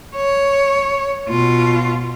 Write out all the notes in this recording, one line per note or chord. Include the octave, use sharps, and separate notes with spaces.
C#5
B2 F4